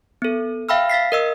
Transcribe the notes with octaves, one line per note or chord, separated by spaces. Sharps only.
B3 A4
E5 F5 G5 B5 E6 F6
F5 A6 B6 C7
A#4 D#5 E6